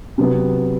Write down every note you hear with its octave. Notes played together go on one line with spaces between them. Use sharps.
C3 F#3 B3